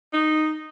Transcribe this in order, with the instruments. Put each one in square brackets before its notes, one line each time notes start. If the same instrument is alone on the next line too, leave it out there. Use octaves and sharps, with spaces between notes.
[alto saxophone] D#4